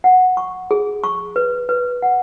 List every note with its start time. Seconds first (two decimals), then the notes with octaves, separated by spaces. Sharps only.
0.04 F#5
0.37 C#6
0.71 G#4
1.04 C#6
1.36 B4
1.69 B4
2.02 F#5